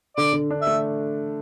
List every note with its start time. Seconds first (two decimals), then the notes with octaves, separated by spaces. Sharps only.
0.17 D3 D5
0.33 D3
0.51 D4
0.61 E5
0.67 A3